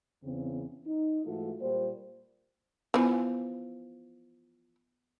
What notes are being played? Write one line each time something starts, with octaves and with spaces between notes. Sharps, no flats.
E2 C#3 C4
D#4
G#2 E3 A3 F4 F#4 A4
A#2 G3 A#3 C5
E3 F3 B3